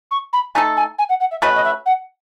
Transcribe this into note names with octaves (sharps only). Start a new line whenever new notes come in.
C#6
B5
A3 D#4 A4 G#5
G#5
G#5
F#5
F#5
E5
A3 C#4 F#4 B4 D#5
D#5
E5
F#5